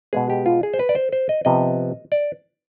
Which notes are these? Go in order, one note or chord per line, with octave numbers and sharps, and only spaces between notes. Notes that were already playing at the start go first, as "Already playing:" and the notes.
B2 G#3 B3 G#4
G4
F4
G#4
C5
B4
D5
C5
C5
D#5
C3 F3 B3 D#5
D5